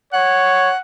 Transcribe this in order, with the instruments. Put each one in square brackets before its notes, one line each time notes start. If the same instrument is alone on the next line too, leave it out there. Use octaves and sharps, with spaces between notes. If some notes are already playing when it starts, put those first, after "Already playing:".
[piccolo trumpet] C#5 [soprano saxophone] F#5